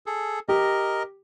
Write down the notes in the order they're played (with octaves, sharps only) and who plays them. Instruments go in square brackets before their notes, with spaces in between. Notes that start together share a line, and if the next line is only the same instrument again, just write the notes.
[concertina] G#4 A4
[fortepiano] G4 [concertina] A#4 D#5